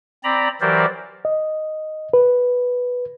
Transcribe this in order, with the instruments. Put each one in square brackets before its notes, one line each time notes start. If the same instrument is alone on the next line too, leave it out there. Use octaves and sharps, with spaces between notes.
[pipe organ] C4 D5 A#5 B5
E3 F#3 G4 A#4 C5 D5
[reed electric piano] D#5
B4